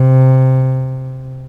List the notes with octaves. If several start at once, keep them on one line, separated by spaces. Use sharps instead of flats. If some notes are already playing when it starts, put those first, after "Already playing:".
Already playing: C3